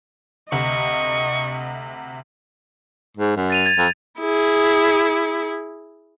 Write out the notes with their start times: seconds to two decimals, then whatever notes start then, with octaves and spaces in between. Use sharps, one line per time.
0.52 D2 C3 D#5 C#6
3.17 G#2
3.37 F#2
3.50 A6 D#7 F7
3.66 G#6 A6
3.78 F2
4.19 E4 G#4